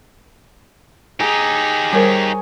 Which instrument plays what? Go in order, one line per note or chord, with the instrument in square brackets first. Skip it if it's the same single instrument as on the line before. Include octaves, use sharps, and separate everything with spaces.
[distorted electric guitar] D#4 G4 [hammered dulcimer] G#4 A#5
[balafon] G3 A#4 C5 [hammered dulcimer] G#4 C#5